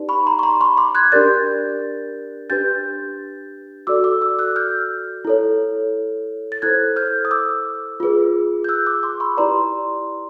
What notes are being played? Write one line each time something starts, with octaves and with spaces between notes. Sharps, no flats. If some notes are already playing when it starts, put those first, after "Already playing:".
Already playing: D#4 G4 B4 D5
B5 C#6
A#5 C6
C#6
A#5 C6
B5 C#6
C6 D6
F#6 G#6
D4 G4 A#4 D5 G6 A6
D4 G4 B4 G6 A6
F#4 A4 D5 D6 E6
D6 E6
D6 E6
E6 F#6
F6 G6
E4 A4 C#5
A6
E4 A4 C5 F#6 G#6
F6 G6
D#6
D6 E6
F4 G#4 B4
G6
E6 F#6
D6 E6
C6 D6
B5 C#6
E4 G4 B4 D5 A#5 C6